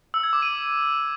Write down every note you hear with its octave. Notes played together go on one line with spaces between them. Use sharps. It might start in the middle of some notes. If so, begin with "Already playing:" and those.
E6
G#6
D6
D#7